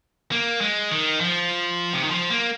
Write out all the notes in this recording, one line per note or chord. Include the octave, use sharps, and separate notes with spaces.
A#3
G#3
D#3
F3
C3
D#3
F3
A#3